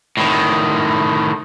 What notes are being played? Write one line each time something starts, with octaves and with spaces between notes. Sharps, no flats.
A2 D#3